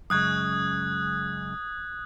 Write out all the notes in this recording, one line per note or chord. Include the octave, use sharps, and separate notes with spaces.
F#2 C#3 G#3 D#6 F#6 G#6